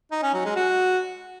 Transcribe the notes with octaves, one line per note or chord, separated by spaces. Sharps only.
D#4
C#4
F#3
G#3
F#4